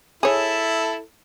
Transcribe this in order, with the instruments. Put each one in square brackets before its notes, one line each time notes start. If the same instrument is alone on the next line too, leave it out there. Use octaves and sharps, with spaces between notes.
[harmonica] E4 A4 [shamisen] G#4 C#5